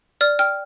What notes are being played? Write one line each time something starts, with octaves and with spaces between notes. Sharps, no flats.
D5 F6
G5 F6